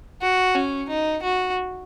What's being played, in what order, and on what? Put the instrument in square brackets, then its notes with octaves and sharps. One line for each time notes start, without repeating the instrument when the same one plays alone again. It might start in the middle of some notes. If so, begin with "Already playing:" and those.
[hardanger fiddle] F#4
C#4
D#4
F#4